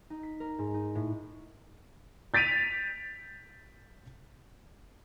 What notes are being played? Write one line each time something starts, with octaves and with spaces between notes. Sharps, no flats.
D#4
B6
A#4
G#2
D#4
A2
G6 A6 B6 D7 D#7 F7